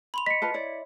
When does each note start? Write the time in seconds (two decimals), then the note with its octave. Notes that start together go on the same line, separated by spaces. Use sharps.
0.14 B5 C6 F7
0.26 D#5 B6 C#7
0.42 F4 B4 A5
0.54 E4 C#5 D5